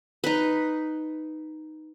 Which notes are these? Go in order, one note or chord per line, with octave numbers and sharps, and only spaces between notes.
D#4 B4